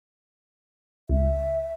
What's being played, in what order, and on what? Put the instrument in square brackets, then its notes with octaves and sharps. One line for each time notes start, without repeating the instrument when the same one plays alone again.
[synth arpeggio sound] C#2 [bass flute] E5